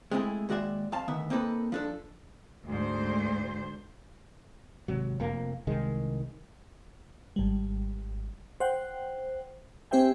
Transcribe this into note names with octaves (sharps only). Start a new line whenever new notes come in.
G#3 A3 C4 D#4 E4 G#4
D#2 G#3 F#4 D5 E5
F2 F5 A5
D2 D#3 B3 E5
A#3 C4 D#4 A4 B4
F3 D4 A4
D2 G#2 C5
G#1 C3 F#3
F1 F2 A#3
C2 D#3 G#3
G#1 G3
C5 F#5 G5
C4 G4 C5 E5 G5 G#5